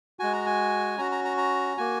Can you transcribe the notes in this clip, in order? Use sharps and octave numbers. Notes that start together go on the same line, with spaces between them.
G#3 F#4 G#5
A#5
G#5
C#4 F#4 A#5
A#5
A#5
A#5
A#3 F#4 G#5